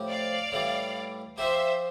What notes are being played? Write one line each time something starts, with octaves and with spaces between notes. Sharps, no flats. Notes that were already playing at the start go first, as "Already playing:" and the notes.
Already playing: A2 F3 C4 G4
D5 F5
A2 E3 G3
F3 C4 G4 C5 E5